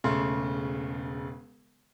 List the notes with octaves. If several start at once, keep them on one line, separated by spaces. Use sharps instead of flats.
E1 C#3 A3 C6